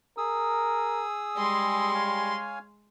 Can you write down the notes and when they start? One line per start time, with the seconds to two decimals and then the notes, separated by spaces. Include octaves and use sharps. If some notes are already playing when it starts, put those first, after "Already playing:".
0.17 G#4 A#4 D#6 E6
1.37 G3 G#3 C6
1.94 C#5 F5 G#5